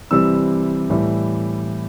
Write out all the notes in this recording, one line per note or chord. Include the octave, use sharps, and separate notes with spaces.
C3 E3 G3 E6
A2 E3 G3